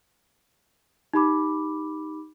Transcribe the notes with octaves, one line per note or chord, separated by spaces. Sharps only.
D#4 G4 B5 D6